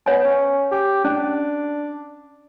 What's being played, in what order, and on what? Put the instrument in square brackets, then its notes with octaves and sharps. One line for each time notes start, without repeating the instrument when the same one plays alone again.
[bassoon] B3 [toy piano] C#5 G#5
[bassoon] C#4
G4
[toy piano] C#4 [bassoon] D4